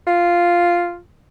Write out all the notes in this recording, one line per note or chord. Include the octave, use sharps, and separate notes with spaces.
F4